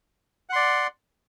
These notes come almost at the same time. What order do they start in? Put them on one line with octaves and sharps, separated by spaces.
F#5 C6 D5